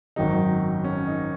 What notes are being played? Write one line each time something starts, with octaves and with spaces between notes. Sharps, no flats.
G#1 F#2 D#3 F#3 D#4
C#4
D#4